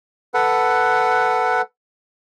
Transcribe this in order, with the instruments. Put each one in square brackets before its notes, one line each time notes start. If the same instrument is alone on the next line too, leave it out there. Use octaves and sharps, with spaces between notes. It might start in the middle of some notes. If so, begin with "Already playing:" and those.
[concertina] A4 B4 F#5